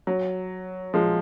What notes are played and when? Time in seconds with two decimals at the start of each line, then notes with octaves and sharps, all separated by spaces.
0.07 F#3
0.94 F3 G#3